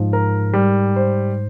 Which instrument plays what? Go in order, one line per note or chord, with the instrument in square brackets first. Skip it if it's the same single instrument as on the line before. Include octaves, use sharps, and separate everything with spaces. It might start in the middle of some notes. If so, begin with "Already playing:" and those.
Already playing: [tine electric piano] G#2 [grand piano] F3
[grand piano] A#4
G3
C5